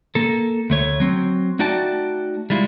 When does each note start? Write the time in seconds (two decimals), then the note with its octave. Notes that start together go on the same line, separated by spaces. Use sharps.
0.15 A#3 A4
0.70 D2 A3 C#5
1.00 F#3 C4
1.59 A3 D#4 F#4 D5 G5 A5
2.50 G3 G#3 E4 F4